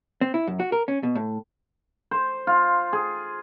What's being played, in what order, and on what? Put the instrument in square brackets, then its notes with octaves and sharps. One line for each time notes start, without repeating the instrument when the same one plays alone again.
[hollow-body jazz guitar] C4
E4
F#2
F#4
A#4
C#4
B2
A2
[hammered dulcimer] C5
F4
G#4